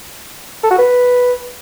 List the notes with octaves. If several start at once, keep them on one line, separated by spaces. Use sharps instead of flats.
A4
F#4
B4